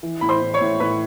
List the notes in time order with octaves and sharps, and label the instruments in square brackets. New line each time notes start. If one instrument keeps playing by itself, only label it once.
[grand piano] E3
[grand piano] A2 [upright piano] B5
[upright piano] C5 C6
[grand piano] A2
[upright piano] C#5 C#6
[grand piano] A2
[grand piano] A2 [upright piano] B4 B5